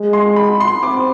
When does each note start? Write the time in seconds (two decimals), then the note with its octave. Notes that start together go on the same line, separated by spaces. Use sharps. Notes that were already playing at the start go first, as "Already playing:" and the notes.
Already playing: G#3
0.13 C6
0.36 B5
0.60 C6
0.83 C4 D6